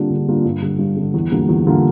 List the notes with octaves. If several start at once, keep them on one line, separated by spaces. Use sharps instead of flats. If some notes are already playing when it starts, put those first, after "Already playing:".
Already playing: D3 G3 A#3 D4 F4
D3
G3 A#3 D4 F4
G2
D3 G3
G2
D3 G3
E2
D3 G3 A#3 F4
E2
D3 G3 A#3 F4